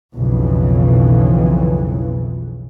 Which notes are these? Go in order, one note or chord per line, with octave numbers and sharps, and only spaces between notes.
B1 F2 C#3 E3